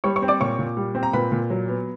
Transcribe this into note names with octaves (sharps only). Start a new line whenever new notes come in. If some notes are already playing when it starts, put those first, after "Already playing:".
G3 C#5 C#6
C#5 C#6
C4
D5 D6
A#2 C#5 C#6
A#2
G3
C4
A#5
A#2 B4 B5
A#2
F#3
B3